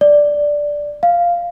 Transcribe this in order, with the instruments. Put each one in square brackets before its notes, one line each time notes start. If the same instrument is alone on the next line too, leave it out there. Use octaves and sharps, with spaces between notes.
[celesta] D5
F5